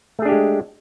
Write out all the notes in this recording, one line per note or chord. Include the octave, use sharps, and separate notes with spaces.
G#3 A3 D4 G4 G#4